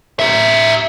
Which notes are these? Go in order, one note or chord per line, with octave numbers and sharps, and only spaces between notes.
D#4 E5